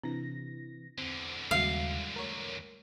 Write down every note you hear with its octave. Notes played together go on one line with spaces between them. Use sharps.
C3 E3 D4 A#6
E2 D3 C4
D#2 C#3 G3 G#3 F#4 F5
A3 A#4 C#5